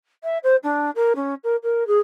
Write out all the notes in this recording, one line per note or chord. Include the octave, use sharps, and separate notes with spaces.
E5
C5
D4
A#4
C#4
A#4
A#4
G#4